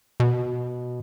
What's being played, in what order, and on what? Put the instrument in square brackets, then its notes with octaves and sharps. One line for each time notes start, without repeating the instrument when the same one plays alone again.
[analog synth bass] B2